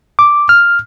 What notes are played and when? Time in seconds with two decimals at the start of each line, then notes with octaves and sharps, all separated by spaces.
0.19 D6
0.49 F6